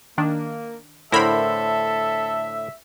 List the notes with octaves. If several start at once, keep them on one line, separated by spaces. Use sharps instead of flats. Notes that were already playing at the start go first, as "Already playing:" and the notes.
D#3 A#3 D4
A2 D3 E4 A4 A#4 C5 E5 B5